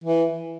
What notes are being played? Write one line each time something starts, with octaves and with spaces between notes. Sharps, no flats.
E3